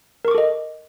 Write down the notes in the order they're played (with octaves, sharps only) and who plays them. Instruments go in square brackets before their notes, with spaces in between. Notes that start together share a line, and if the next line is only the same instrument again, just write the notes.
[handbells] A#4
C#6
D6
A4
D#5